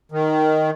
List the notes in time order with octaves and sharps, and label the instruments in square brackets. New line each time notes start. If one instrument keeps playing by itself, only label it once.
[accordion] D#3